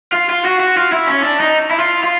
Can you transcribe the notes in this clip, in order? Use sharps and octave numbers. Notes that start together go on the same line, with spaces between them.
F4
F4
F#4
F#4
F4
E4
C#4
D4
D#4
E4
F4
F4